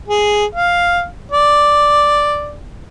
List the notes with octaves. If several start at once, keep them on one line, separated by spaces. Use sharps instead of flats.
G#4
F5
D5